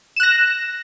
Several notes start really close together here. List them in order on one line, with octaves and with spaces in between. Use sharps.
E7 F#6 A#6